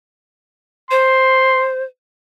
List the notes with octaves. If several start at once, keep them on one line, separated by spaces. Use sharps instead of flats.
C5 C6